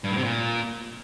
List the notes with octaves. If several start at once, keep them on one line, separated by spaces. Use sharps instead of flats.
G2
A2
C3
A#2